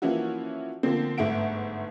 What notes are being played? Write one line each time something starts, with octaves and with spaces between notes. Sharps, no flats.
E3 F3 A#3 C#4 E4 F#4
D3 F3 A#3 C4
G1 G#2 A3 E5 F#5 D7